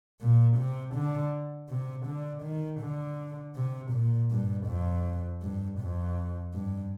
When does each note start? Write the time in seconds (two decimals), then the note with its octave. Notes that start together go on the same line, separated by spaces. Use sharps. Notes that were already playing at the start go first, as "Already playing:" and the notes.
0.21 A#2
0.57 C3
0.95 D3
1.70 C3
2.06 D3
2.44 D#3
2.81 D3
3.55 C3
3.92 A#2
4.31 G2
4.67 F2
5.42 G2
5.79 F2
6.54 G2